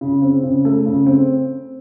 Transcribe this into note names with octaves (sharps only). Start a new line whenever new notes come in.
C#3
C4
C#3
A3
C#3
C4